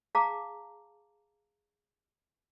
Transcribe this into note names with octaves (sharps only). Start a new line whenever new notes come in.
G#4 F5 A5 A#5 D6